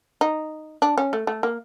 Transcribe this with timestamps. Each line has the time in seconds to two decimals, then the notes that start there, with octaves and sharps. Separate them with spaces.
0.21 D#4
0.82 D4
0.98 C#4
1.13 A3
1.27 A3
1.43 A#3